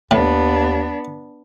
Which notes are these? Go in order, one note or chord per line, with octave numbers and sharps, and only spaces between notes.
D#2 A2 B3 D4